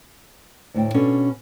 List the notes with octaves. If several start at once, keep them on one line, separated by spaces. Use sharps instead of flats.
D2 A2 G5
B2 C#4 D4 A4